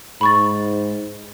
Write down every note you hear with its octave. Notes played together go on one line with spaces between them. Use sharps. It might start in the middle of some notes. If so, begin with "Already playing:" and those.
G#2 B5 C#6 A6